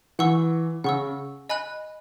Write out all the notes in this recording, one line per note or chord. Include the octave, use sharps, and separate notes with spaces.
E3 F#5 C#6 E6
C#3 F#5 C#6 E6
D#5 G#5 B5 F#6